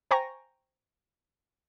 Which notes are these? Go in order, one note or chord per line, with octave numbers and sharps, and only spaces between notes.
C5 G5 G#5 A#5 C#6 A#6